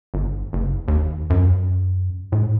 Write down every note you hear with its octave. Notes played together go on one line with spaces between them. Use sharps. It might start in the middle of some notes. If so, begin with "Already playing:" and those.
G1
F#1
D#2
F#2
A2